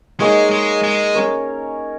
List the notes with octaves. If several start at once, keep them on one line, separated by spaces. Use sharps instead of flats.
G#3 A#3 D#4 G#4 C#5
G#3
G#3
C#4 A#4 C#5